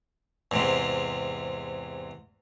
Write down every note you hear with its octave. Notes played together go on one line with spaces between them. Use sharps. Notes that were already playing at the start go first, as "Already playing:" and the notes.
E2 G#2 C3